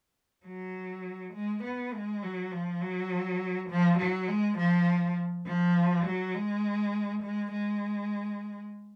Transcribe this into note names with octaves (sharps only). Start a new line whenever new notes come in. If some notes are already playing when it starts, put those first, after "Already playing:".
F#3
G#3
B3
G#3
F#3
F3
F#3
F3
F#3
G#3
F3
F3
F#3
G#3
G#3
G#3